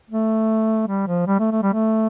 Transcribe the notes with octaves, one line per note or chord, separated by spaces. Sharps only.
A3
G3
F3
G3
A3
A3
G3
A3